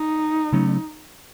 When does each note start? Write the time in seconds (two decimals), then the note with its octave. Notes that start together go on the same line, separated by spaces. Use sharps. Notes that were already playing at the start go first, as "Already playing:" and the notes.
Already playing: D#4
0.52 C#3 F#3 A3 C#4